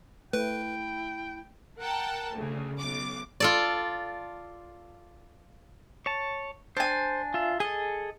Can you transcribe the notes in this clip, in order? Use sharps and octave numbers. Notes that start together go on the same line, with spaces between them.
A3 E4 B4 G5
A#4 F#5 G5 A5
D2 C#3
B1 D6
F4 A4 D5
C#5 A5
D4 C5 G#5
F4 E5
G#4 A4 D#5